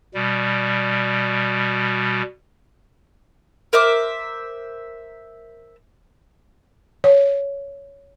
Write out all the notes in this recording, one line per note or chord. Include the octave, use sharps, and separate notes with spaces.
B2 G3
A#4 C5 E5 D6
C#5